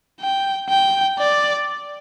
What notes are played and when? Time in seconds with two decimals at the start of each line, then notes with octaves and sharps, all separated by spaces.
0.20 G5
0.69 G5
1.19 D5